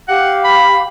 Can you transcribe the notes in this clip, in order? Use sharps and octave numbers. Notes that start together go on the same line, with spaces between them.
G4 F5 F#5 D6
B5